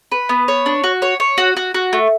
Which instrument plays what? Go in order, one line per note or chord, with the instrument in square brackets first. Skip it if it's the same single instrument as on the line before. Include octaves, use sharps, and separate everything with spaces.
[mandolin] B4
B3
C#5
D4
F#4
C#5
C#5
F#4
F#4
F#4
A3